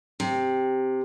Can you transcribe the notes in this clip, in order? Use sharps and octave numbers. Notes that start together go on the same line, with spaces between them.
C3